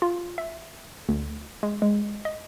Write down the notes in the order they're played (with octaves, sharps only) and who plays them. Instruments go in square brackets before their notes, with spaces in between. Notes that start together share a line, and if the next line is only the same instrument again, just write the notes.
[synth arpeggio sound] F4
E5
D2
G#3
G#3
D#5